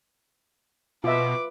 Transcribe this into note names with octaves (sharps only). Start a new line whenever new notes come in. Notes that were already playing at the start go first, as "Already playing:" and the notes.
B2 F4 B4 E5 D6